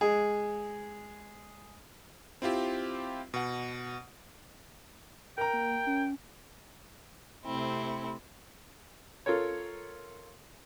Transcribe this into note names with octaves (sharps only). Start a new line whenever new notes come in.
G#3 G#4
C4 E4 F4 G4
B2 F#5
A#4 G5 A#5
A#3
C#4
C3 A3 C4 E4
F4 A4 A#4 C#5